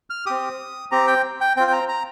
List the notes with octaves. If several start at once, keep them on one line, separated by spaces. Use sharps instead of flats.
F6
C4 G4 D#6
C4 G4 A#5
G5
G5
C4 F4 G5
G5
A#5
A#5